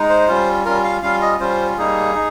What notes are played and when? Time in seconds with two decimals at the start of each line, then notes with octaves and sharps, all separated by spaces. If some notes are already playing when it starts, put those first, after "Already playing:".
Already playing: G#3 D#4
0.09 C5
0.28 G3 C#4 F4
0.65 G3 C#4 F4 A#4
0.84 F5
1.03 G3 C#4 F4 F5
1.21 D#5
1.40 G3 C#4 F4 C5
1.78 G3 A#3 D#4 G#4
2.15 D#4